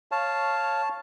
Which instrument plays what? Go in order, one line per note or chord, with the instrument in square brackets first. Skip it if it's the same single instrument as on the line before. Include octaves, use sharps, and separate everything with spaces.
[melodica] C#5 F5 [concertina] A5